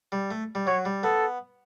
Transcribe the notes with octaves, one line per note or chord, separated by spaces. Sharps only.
G3
A3
G3
F#3 C#5
G3
B3 A4